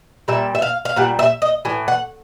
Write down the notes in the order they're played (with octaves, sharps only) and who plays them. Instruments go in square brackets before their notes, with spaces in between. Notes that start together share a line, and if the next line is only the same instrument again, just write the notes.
[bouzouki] A#2 G3 E5
E5
F5
F5
A#2 G3 F#5
E5
D#5
A2 E3
F#5